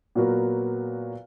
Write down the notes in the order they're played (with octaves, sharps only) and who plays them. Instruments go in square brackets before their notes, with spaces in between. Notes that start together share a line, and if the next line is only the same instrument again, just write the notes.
[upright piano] A#2 F#3 B3 F#4 A#4